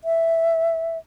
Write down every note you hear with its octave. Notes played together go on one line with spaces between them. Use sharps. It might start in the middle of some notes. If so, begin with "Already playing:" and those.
E5